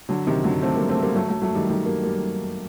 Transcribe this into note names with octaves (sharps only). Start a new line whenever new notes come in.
D3 F#3
C3 D#3
D3 F#3
A3 C4
G3 A#3
A3 C4
G3 A#3
F#3 A3
F#3 A3
F#3 A3
D#3 G3
D#3 G3
G3 A#3
G3 A#3